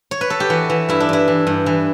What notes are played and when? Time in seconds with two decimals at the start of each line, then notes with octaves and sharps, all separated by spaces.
0.11 C#5
0.21 B4
0.30 A4
0.40 G4
0.50 E3 F#4
0.70 E3
0.89 G2 E4
1.00 D4
1.09 G2 E4
1.28 E3
1.47 G2
1.66 E3